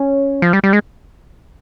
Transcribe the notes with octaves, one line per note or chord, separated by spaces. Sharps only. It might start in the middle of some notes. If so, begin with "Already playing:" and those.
Already playing: C#4
F3
G3
G3
G#3